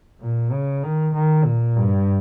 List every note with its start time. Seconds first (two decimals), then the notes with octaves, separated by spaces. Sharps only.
0.21 A#2
0.52 C#3
0.84 D#3
1.14 D#3
1.45 A#2
1.77 G2